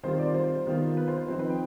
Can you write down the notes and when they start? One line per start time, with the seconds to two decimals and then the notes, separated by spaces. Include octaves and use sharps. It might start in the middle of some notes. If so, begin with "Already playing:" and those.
0.03 D#3 G3 C4 F4 C5
0.19 D5
0.34 C5
0.67 D#3 B3 F4
0.97 B4
1.08 C5
1.28 F3 C4 D#4 C5
1.39 B4
1.50 G5